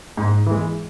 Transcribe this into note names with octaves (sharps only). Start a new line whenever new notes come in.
G#2
E3 G#3